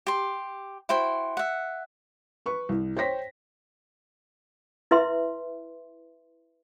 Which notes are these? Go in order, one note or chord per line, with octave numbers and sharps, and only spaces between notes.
G4 C6
E4 F#4 C5 G5
E5 F#5
B4 C#6
C2
C5 C#5 G5 A#6 B6
E4 B4 E5 C6